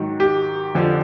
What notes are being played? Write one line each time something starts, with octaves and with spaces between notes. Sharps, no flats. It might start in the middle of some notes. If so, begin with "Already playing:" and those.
Already playing: G#2 D#3 F#3
G4
F2 D3 F3